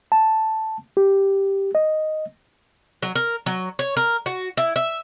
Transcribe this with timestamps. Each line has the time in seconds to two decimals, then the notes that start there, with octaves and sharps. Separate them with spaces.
0.12 A5
0.97 G4
1.75 D#5
3.02 F#3
3.15 A#4
3.46 F#3
3.79 C#5
3.97 A#4
4.26 F#4
4.57 E4
4.76 E5